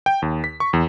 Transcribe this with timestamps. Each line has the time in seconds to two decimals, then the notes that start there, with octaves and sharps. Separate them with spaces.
0.06 G5
0.22 D#2
0.44 B6
0.60 C#6
0.73 E2